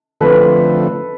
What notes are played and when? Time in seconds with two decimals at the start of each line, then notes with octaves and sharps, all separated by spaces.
0.21 D3 F3 A3 C4 A4 B4